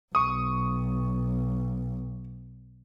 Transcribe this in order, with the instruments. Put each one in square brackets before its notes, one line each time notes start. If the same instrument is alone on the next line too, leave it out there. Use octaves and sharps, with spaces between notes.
[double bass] B1 [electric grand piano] C#6 D#6